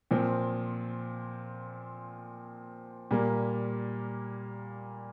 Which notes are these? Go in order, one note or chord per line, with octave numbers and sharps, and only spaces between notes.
A#2 F3 C4
A#2 G3 A#3